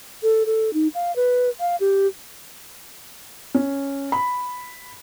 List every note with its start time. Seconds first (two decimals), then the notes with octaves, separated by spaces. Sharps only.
0.23 A4
0.46 A4
0.74 D#4
0.95 F5
1.16 B4
1.60 F5
1.80 G4
3.54 C#4
4.12 B5